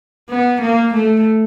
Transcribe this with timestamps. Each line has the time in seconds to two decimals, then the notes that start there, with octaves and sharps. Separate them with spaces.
0.29 B3
0.61 A#3
0.94 A3